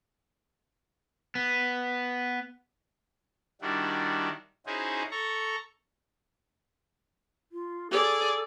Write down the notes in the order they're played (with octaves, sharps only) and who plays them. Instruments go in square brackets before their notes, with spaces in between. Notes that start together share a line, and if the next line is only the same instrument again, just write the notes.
[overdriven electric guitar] B3
[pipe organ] D#3 G3 D4 E4 F#4
C#4 D#4 E4 F#4 G#4 C5
A4 A#5 C#6
[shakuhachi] F4
[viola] G#4 D5 [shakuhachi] A4